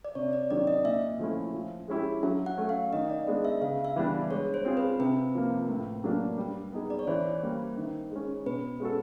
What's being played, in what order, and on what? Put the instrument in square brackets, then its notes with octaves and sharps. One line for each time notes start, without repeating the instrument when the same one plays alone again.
[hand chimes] D5
[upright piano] C3 [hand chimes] C#5
[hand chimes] D5
[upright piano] D#3 F#3 [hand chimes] D5
[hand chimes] D#5
[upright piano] A#2 [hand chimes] E5
[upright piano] F3 A3 C#4 E4
F3
G#3 C#4 E4 G4
[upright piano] F#3 [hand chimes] E5
[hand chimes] F#5
[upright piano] A3 C#4
[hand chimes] F5
[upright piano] D#3 [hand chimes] D#5
[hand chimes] D5
[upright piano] G#3 B3 D4 [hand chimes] D#5
[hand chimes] E5
[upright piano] C#3 [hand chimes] F5
[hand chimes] E5
[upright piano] E3 G3 B3 D4
[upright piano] G#3 [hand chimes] C#5
[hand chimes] C5
[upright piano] C4 F4 G#4
[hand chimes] B4
[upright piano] C3 [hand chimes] B4
[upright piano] F3 A#3
A2
F#3 A#3 D4
G3
B3 D#4 G#4
[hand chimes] D5
C#5
[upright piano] E3 [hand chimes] C5
[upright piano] G3 A#3
D#3
G#3 C#4
[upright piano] B2 [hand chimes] B4
[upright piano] G#3 C#4 F#4 A4